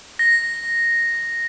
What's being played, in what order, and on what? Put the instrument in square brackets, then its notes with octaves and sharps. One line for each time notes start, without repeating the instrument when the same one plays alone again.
[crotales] A#6